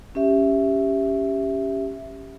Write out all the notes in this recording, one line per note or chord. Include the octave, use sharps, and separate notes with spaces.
C#4 G4 E5